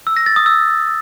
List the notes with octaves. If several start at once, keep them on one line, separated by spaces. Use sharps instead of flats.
E6
A#6
A6
D#6
E6